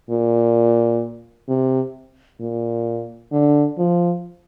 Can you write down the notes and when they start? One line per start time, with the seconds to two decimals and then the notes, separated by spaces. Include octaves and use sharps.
0.10 A#2
1.48 C3
2.40 A#2
3.32 D3
3.78 F3